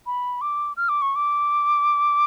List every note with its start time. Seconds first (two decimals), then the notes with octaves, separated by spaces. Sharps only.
0.06 B5
0.41 D6
0.77 F6
0.89 D6
1.02 C#6
1.16 D6